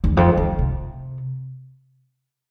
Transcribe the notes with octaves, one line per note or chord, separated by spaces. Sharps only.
E2
F2
F2
C3